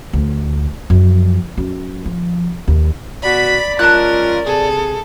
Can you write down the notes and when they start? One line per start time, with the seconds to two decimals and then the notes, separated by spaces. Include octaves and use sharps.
0.13 D2
0.90 F#2 F3
1.57 F#2
2.05 F3
2.67 D#2
3.23 B2 F#4 D5 B5 B6
3.79 G#3 C#4 F4 A#4 A5 F#6
4.46 C3 G#4 A4